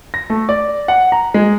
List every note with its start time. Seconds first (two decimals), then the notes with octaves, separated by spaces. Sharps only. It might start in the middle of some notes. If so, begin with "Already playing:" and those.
0.14 A#6
0.30 A3
0.49 D5
0.88 F#5
1.12 A#5
1.34 G#3